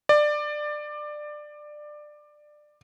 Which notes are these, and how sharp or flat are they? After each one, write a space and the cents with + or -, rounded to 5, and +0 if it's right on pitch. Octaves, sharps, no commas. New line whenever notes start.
D5 +20